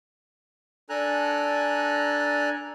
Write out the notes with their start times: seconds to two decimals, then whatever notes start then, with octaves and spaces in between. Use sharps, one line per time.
0.90 D4 A4 G#5 A#5 F#6